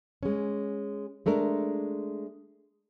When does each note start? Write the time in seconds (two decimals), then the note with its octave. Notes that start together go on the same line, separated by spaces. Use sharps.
0.23 G#3 C#4
1.26 G#3 A3 D4 A#4